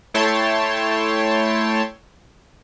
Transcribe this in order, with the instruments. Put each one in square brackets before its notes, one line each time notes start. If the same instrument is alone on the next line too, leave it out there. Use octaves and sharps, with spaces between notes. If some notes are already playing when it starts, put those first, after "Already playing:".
[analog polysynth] A3 E4 C#5 G5 A5 C6